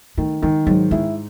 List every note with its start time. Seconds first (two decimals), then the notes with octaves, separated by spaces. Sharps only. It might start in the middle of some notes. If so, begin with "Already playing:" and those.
0.18 D#3 A3
0.42 D#3 G#3
0.66 G#2 F#3
0.91 G#3 E4